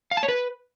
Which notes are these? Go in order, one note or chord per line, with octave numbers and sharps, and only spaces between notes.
F5
A5
C#5
B4